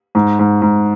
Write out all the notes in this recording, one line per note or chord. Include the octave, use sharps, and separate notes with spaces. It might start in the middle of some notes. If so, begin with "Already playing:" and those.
G#2
G#2
G#2